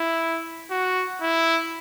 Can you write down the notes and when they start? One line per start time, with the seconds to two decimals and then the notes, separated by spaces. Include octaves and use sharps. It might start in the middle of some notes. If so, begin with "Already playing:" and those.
Already playing: E4
0.71 F#4
1.22 E4